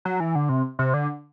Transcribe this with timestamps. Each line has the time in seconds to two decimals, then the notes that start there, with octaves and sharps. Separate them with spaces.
0.05 F#3
0.20 E3
0.35 D3
0.49 C3
0.79 C3
0.94 D3